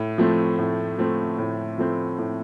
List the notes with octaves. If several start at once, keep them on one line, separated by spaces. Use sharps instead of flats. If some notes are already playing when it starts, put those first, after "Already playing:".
Already playing: A2
F3 A3 C4
A2
F3 A3 C4
A2
F3 A3 C4
A2